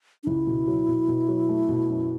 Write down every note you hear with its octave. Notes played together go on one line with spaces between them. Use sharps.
D4
C#2 E4
B2
F#3
B2
B2
F#3
A3
B2
F#2